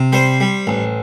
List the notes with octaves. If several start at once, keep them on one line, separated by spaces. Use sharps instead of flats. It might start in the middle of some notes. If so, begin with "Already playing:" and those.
Already playing: C3
G3 C5
G3
A1